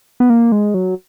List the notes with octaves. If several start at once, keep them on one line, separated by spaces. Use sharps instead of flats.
B3
A#3
G#3
F#3